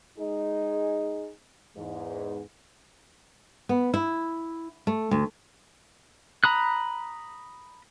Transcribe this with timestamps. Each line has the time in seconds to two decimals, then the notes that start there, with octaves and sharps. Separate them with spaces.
0.19 G#3 D#4 G#4
1.76 E2 G#2
3.69 B3
3.94 E4
4.87 A3
5.11 D2
6.44 A#5 B5 D#6 F#6